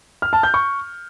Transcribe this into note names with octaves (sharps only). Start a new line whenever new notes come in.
F6
A5
G6
C#6